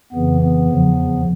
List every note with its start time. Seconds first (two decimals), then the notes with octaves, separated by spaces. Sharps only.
0.12 F2 C#3 E3 B3
0.41 B3
0.69 E2 C#3 F3